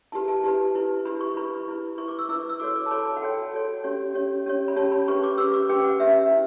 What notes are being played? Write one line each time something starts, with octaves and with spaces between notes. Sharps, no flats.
E4 G4 B4 A5
A5
E4 G4 B4 A5
E4 G4 B4
E4 G4 B4 B5
C#6
E4 B4 B5
E4 B4
E4 B4 C#6
D6
E6
E4 B4 E6
E6
F#4 A4 C#5 D6
D6
A5
F#4 A4 C#5 B5
A5
F#5
F#4 A4 C#5 G5
A5
F#4 A4 C#5
C#4 G4 C#5
C#4 G4 C#5
C#4 G4 C#5
B5
C#4 G4 C#5 A5
B5
C#4 G4 B4 C#6
D6
C#4 G4 B4 E6
D6
C#4 G4 B4 G5
F#5
C#4 G4 B4 E5
E4